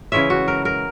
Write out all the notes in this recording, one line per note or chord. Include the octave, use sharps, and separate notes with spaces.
C#3 E3 G#3 C#4 E5
F#4
A#4
A#4